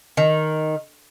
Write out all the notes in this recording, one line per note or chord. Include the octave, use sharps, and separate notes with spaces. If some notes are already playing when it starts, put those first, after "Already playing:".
D#3